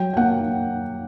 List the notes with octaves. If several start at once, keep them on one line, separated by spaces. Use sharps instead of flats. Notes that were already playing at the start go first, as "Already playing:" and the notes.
Already playing: F#3 G5
G5
A#3 F#5